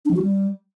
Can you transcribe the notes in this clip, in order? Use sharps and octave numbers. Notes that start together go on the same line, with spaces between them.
D4
F3
F#4
G3